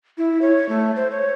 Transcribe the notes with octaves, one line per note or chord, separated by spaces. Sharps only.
E4
C#5
A3
C5
C#5